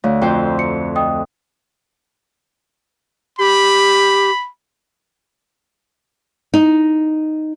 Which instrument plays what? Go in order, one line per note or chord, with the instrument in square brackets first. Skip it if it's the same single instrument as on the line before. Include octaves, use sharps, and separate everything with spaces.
[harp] D2 [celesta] C#5 F5
[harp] F2 C5 G6 [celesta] G5
[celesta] C#7
D#5 G5 D#6
[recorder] G4 [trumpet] B5
[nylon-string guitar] D#4